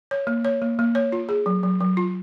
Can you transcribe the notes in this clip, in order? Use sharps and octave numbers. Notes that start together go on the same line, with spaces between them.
C#5
A#3
C#5
A#3
A#3
C#5
F4
G#4
F#3
F#3
F#3
F4